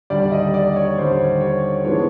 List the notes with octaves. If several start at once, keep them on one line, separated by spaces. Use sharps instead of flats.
D#2 D3 G3 D5
D#5
D5
C#5
D#2 D3 G3 C5
C#5
G#2 E3 G#3 B3 D4 C#5